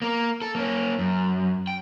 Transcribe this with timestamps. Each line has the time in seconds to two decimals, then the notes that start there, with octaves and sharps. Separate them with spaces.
0.02 A#3 A#4
0.42 A4
0.55 A#3 C#4
0.99 F#2
1.67 G5